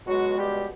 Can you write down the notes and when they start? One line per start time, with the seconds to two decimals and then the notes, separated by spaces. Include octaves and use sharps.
0.07 C#2 B2 F#3 G#3 F#4
0.37 G3 G4